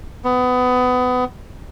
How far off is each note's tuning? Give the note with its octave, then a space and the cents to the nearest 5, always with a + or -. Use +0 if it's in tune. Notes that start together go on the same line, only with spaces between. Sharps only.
B3 +25